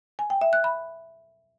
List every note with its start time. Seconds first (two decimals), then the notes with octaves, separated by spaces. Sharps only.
0.19 G#5
0.30 G5
0.41 E5
0.53 F#6
0.64 B5